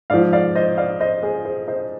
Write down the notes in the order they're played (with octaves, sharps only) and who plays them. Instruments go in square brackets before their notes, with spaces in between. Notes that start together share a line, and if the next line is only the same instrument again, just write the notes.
[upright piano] G#2 F3 D5 F5
D5 F5
C5 D#5
D5 F5
C5 D#5
G#4 C5
G#4 C5
C5 D#5